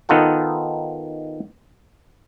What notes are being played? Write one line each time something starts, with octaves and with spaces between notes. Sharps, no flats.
D#3 B3 D#4 F4 A4 F#5